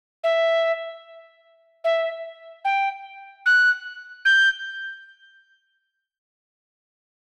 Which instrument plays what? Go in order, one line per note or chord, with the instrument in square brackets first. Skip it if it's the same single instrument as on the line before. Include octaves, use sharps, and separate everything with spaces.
[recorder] E5
E5
G5
F#6
G6